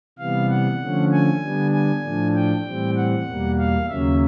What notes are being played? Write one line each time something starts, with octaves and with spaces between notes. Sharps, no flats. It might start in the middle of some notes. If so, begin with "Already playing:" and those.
C3 E3 G3 B3 F5
F#5
D3 F3 A3 C#4
G#5
D3 G3 B3 D4
G#5
A2 F3 A3 D4
G5
A2 E3 G3 C4
F#5
E2 B2 G3 A#3
F5
D#2 C#3 F#3 A#3 C#4 E5